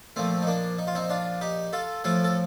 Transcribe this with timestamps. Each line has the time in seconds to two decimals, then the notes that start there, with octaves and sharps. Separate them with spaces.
0.16 A#2 F3 A3 C4
0.42 D#4
0.47 A#3 D4
0.78 D#4
0.87 F4
0.95 C4 D#4
1.09 D4 F4
1.41 D#4 G4
1.73 F4 A4
2.04 A2 F3 F4 A4
2.24 A4